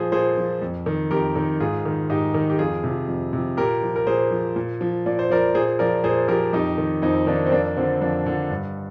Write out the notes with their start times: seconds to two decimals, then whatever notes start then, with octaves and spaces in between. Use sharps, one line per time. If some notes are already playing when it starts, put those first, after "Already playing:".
Already playing: A#2 F3 G#4 C5
0.12 A#2 G#4 C5
0.37 F3
0.62 F2
0.86 D#3
1.11 F2 G4 A#4
1.36 D#3
1.60 G#2 F4 G#4
1.85 D#3
2.10 G#2 D#4 G4
2.34 D#3
2.50 G4
2.59 F2 F4 G#4
2.84 C3 F3
3.08 F2
3.33 C3 F3
3.57 A#2 G4 A#4
3.83 F3
3.96 A#4
4.07 A#2 G#4 C5
4.31 F3
4.56 A#2
4.81 F3
5.06 A#2 D5
5.19 C5
5.30 F3 A#4 D5
5.55 A#2 G#4 C5
5.79 F3 A#4 D5
6.04 A#2 G#4 C5
6.28 F3 G4 A#4
6.53 F2 D#4 G4
6.78 D#3
7.02 F2 C4 D#4
7.27 D#3 A#3 D4
7.47 C4
7.52 F2 A#3 D4
7.77 D3 F3 C4
8.01 F2 A#3 D4
8.26 D3 F3
8.50 G2